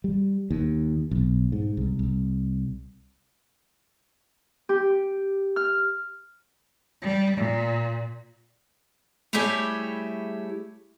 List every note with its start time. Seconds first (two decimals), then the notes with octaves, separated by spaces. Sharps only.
0.04 G3
0.51 D#2
1.11 B1
1.52 G#2
1.77 C2
1.99 C2
4.69 G4
5.56 F6
7.02 G3
7.37 A#2
9.33 G3 A3 E4 G4 G#4 C#5